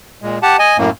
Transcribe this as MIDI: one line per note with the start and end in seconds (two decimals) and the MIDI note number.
0.22 0.38 46
0.22 0.38 56
0.42 0.57 67
0.42 0.57 78
0.42 0.57 81
0.59 0.77 75
0.59 0.77 80
0.78 0.90 42
0.78 0.90 45
0.78 0.90 58